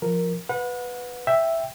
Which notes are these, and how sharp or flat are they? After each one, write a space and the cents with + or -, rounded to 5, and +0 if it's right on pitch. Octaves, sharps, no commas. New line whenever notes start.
F3 +0 A#4 +0
B4 +0 F#5 -35
E5 +0 G5 +0